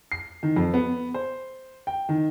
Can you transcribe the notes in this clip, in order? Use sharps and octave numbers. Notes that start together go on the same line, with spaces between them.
C7
D#3
F2
B3
C5
G5
D#3